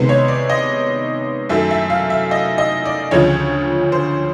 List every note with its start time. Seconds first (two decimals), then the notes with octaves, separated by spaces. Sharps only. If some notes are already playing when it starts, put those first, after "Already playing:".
Already playing: C3 D#3 G#3 B3 C5
0.09 C#5
0.28 D5
0.50 D#5
1.49 F#2 D#3 F#3 A3 E5
1.71 E5
1.90 F5
2.10 E5
2.31 D#5
2.58 D#5
2.85 D5
3.11 D2 C#3 F3 C#5
3.92 C5